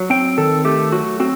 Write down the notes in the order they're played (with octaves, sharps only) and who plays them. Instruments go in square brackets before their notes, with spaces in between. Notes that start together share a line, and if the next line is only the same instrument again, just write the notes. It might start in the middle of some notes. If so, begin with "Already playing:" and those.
Already playing: [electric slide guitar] F#3
C4 G5
D#3 A4
A3 G4
F#3 F#4
C4 F#4